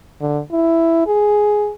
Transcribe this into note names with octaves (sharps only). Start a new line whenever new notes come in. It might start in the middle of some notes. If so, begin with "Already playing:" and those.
D3
E4
G#4